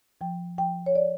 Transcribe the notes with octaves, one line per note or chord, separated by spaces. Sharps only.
F3 G5
F3 G5
C#5
D5